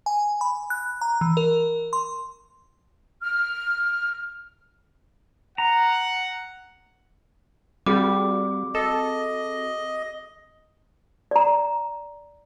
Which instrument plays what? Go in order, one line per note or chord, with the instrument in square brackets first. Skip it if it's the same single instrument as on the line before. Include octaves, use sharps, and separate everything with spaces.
[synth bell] G#5
B5
F#6
A#5
E3
A#4
C6
[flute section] F6
[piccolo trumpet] F#5 [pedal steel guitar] A#5
[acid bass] G3 [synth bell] C4 F#4 G#4 [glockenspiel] D6
[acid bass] A4 [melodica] D#5
[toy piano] D5 A#5